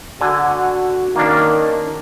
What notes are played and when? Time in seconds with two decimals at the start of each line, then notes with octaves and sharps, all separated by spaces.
0.21 D3 F#4 G#5
1.16 D#3 A#3 C#4 D4